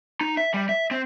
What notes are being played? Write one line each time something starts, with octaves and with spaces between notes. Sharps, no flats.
D#4
E5
G3
E5
C4